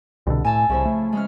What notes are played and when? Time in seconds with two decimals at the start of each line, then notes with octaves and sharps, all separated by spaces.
0.27 C2 B2 D3
0.45 A2 G#5 A5 E6
0.69 C2 C#3 F3 E4
0.85 A3
1.12 G#3 C#4 F6